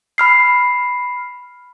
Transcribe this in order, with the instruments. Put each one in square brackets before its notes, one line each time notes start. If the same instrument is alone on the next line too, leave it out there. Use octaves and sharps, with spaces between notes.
[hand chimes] B5 F6 C7